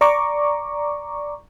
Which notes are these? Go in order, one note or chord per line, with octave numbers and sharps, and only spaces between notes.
D5 A#5 C#6 D6